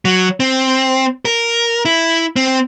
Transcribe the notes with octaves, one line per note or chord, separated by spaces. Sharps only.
F#3
C4
A#4
E4
C4